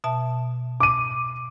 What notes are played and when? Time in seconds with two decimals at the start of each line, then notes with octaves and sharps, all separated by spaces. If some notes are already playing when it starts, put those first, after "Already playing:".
0.04 B2 E5 A5
0.80 D6 D#7